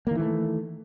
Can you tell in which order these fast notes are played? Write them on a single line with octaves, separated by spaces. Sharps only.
A#3 D#3 E3 A3